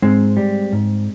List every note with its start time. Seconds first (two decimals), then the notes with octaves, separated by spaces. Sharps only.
0.02 G#2 G#3 C4
0.37 G3
0.72 G#2